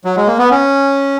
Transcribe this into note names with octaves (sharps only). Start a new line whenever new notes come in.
F#3
G#3
A#3
B3
C#4